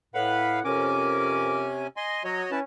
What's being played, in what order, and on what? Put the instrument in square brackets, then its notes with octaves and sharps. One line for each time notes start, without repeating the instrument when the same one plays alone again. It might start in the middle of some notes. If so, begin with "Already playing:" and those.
[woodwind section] A2 F#5 [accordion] B4 F5 B5
[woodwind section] F2 A#4 D6 [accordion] C3 C#4 G#5
[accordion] D#5 G#5 C6
[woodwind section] F#3 [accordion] F#4 C#5 D#5
[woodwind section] C#4 [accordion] E4 B4 A5